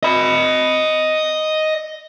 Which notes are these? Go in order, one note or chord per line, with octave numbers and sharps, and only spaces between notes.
D#5 B5